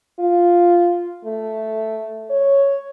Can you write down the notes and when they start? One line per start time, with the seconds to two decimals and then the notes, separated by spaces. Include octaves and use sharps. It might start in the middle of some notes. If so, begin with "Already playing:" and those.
0.19 F4
1.26 A3
2.30 C#5